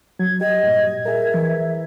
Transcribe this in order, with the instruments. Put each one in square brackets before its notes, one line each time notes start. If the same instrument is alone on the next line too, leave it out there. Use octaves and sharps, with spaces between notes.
[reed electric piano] F#3 [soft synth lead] G#6
[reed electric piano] G4 [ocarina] D#5 [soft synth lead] G#6
[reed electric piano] G2 A#2
[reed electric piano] G#4 A#4 [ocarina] E5
[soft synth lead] E3